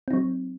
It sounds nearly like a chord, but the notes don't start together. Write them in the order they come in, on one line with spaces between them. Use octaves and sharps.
C4 D#4 F#3